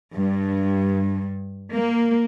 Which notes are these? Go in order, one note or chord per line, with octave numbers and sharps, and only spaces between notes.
G2
A#3